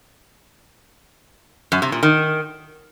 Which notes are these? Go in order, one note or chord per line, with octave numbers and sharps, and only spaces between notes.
F#2
C3
A#2
D#3